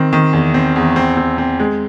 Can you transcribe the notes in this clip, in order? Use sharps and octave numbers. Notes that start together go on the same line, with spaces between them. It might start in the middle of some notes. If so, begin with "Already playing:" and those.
Already playing: D#3 C4
D#3
E2
C4
E2
C4
C4
C4
G#3